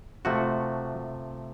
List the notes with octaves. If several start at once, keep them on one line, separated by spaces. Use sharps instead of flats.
C3 F3 A3 F#4